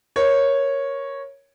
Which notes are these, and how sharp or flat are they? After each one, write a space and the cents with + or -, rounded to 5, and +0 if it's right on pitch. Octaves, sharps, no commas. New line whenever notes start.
A#4 +15 C#5 -5